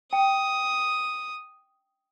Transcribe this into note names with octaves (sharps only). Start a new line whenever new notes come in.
G5 D#6